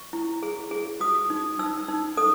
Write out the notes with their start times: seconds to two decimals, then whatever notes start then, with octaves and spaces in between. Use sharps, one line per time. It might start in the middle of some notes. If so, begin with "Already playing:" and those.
Already playing: C#6
0.13 E4
0.43 G#4
0.71 G#4
1.00 F#4 D#6
1.30 D#4
1.59 D#4 E6
1.88 D#4
2.17 A4 D#6